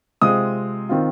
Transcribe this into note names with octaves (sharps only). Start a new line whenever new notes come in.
C3 G#3 C4 F4 D#6
D#3 C4 F4